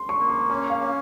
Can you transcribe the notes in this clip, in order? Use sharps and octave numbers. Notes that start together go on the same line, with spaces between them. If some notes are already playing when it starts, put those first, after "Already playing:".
Already playing: C6
C#6
A#3
C#6
C#4 C#6
F5
C#4